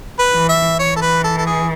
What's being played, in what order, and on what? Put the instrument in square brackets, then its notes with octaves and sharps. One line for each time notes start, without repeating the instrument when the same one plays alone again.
[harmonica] B4
[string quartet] E3
[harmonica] E5
[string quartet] E3 [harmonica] C#5
[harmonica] A4
B4
A4
A4
G#4